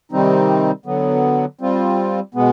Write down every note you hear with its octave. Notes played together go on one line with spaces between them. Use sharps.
C3 D#3 G3 C4 D#4
D3 F#3 B3
G3 C4 F4
B2 G#3 B3